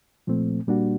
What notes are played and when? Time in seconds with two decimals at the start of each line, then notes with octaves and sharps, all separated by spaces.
0.27 A#2 F3 A3 C4
0.68 A#2 G3 A#3 D4 F#4